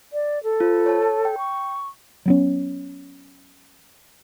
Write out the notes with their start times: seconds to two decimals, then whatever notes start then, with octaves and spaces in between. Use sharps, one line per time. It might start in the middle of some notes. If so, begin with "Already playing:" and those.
0.13 D5
0.43 A4
0.60 F4 C5
0.86 C#5 A5
1.25 G5
1.38 C#6
2.26 F#3 B3 C#4